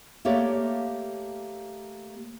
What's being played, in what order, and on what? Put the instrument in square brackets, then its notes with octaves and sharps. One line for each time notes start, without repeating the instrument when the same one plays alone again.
[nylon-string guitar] A3 A#3 G4 C#5 D5